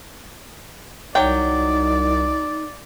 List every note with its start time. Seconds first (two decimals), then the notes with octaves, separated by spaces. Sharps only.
1.15 C2 F#3 D#4 D5 G5